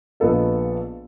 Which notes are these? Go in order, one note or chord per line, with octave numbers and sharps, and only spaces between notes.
A#1 B3 F4 A4 D#5